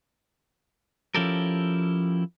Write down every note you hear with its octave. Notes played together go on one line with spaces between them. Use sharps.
F3 C#4 E4 G4 A4 A#4